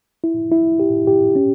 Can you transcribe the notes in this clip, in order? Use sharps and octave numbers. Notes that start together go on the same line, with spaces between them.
E4
E4
G4
G4
C#4